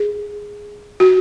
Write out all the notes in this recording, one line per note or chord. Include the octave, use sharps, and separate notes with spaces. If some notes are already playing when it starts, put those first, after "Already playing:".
Already playing: G#4
F#4